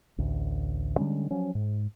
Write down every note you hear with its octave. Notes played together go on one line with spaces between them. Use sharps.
A1 D2
D3 G3 G#3 C#4
F3 F#3 C#4
G#2